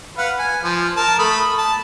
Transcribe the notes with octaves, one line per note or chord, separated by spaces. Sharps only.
B4 F5 F#5
G#5
F3
A#4 A5
A3 B5 D#6
A5